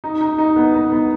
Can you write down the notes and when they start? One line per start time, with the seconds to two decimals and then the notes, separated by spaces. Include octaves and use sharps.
0.04 D#4
0.21 D#4
0.38 D#4
0.56 B3
0.74 D#4
0.92 B3